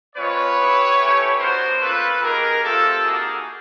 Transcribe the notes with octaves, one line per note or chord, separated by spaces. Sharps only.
G#3 C4 F4 B4 C#5
B3 E4 G4
A3 C#4 E4 G4
B3 D4 F#4 A#4 C5
A#3 C#4 F4 A4 B4
A#3 D#4 G4 G#4 A#4
A3 C4 F4 G4 A4
A#3 D#4 F#4 G#4